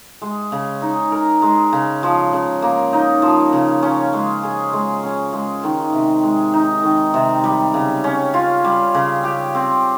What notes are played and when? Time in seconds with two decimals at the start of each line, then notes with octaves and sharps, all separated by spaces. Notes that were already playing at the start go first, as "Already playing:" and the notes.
0.22 G#3
0.52 C#3
0.82 D#4
1.12 A#4
1.42 G#3
1.73 C#3
2.03 F3
2.33 C#3
2.62 A#3
2.93 D#4
3.22 F3
3.53 C#3
3.83 C#4
4.13 G#3
4.43 G#4
4.73 G#3
5.03 C#4
5.33 G#3
5.64 D#3
5.93 C3
6.23 G#3
6.54 D#4
6.83 D#3
7.14 C3
7.44 G3
7.74 C#3
8.04 C#4
8.34 F4
8.64 G3
8.94 C#3
9.24 G4
9.55 C4